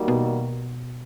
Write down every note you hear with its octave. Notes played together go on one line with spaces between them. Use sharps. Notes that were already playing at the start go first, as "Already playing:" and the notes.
Already playing: D#3 G3 A#3 D#4 F#4
B2